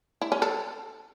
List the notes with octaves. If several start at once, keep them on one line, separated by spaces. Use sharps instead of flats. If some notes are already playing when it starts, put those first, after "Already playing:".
E4
C#4
A4